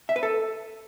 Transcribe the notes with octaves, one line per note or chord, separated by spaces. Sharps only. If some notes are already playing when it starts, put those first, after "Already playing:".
E5
B4
A4